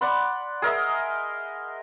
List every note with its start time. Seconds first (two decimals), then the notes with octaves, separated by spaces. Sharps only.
0.01 D5 F#5 B5 C6
0.62 G#4 A#4 D#5 E5